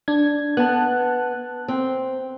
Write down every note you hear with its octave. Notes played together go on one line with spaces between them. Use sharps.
D4 G#6
B3 A5 F#6
C4